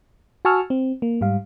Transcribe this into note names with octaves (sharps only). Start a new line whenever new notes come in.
F#4 G#5 A5 C#6 E6 F6
C4
A#3
G#2 G3 F5